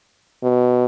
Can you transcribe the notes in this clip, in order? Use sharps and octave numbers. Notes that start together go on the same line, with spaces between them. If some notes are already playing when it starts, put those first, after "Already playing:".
B2